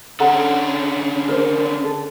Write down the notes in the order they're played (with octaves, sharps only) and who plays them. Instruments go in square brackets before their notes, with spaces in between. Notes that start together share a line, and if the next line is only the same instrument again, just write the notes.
[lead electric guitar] D3 C#4 [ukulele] A4 F#5 A#5
[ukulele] A#4 C5
A4